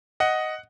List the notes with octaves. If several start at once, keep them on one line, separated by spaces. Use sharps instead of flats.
D#5 F#5